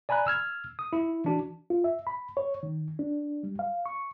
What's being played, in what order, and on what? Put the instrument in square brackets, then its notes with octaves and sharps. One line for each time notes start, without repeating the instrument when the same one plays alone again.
[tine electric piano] D5 G#5 A#5 B5 F#6
E6 F6 G#6
D#6
E4
E3 D4 F#4
[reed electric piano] F4
E5
B5
C#5
D#3
D4
G3
F5
C#6